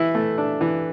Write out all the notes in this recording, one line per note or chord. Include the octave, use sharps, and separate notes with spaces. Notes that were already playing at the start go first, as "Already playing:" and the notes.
Already playing: E3 E4
A3
D4
E3